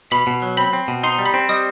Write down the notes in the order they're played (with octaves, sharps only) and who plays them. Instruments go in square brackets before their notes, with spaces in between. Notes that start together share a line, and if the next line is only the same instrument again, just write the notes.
[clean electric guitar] B2 [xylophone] B5 B6
[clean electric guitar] B2
F#3
[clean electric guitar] C4 [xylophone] B5 B6
[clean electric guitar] C4
B2
[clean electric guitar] D#4 [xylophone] C6 C7
[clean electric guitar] G3
[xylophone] B5 B6
[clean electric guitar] C4
[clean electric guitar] G3 [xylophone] D#5 D#6